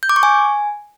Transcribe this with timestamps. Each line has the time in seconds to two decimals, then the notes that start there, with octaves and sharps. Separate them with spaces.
0.03 G6
0.09 D6
0.16 C#6
0.23 G#5